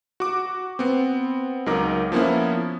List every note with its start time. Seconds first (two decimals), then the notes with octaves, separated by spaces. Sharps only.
0.20 F#4 D6
0.79 B3 C4
1.66 C#2 F#3 D#4 A#4 D6
2.12 F3 A#3 B3 C#4 E4